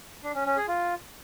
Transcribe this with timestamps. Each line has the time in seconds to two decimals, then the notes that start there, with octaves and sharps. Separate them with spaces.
0.24 D4
0.35 C#4
0.46 C#4
0.57 G#4
0.68 F4